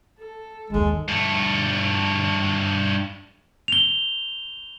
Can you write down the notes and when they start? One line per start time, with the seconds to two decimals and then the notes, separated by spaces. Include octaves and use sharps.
0.19 A4
0.70 D#2 G#2 G#3
1.08 G2 A3
3.68 F7 G7